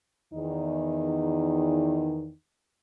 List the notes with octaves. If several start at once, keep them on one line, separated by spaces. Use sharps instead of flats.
E2 D#3 D#4